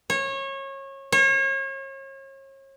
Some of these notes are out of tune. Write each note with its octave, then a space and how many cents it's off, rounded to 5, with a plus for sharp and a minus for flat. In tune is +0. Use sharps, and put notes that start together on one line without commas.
C#5 -25
C#5 -35